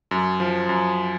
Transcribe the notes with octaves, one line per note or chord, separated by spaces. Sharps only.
F#2
F3
F#2